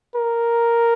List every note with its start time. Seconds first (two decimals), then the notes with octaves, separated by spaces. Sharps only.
0.16 A#4